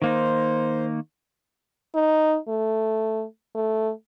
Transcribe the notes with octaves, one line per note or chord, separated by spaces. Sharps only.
D#3 A#3 D#4 C5
D#4
A3
A3